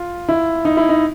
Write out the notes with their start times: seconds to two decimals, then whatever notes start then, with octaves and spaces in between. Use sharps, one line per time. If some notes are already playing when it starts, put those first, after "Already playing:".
Already playing: F4
0.29 E4
0.65 D#4
0.77 E4
0.89 D#4